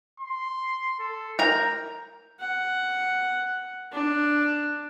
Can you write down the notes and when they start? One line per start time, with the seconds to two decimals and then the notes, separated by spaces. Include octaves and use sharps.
0.20 C6
1.00 A4
1.39 A#4 A#5 G6
2.40 F#5
3.92 D4